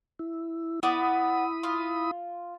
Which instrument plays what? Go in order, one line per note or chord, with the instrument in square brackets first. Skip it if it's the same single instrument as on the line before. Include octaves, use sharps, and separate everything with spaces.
[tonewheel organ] E4
[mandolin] B3 D5 [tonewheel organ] E4 B5 D#6
[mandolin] F4